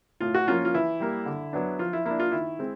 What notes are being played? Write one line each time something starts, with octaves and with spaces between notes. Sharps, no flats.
A2 F4
F#4
F3 A#3 C#4 F4
F4
E3 E4
G3 A#3
D3
F#3 B3 D4
F3 F4
E4
A#3 D4 E4
F4
D#3 E4
G#3 C4